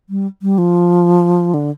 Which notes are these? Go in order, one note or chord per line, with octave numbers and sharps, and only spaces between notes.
G3
G3
F3
D3